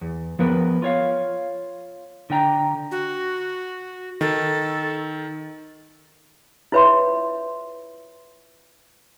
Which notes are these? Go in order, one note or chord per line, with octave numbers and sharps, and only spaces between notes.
E2
F3 B3 A#4 B4
F4 C#5 F5
D3 D4 G5 A#5
F#4
D#3 A4
E4 F4 B4 C#5 E5 C6